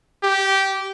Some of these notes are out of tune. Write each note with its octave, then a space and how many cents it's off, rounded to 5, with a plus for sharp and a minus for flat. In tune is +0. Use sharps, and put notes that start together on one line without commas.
G4 -15